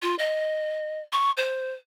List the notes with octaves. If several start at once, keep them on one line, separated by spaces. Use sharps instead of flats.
F4
D#5
C#6
C5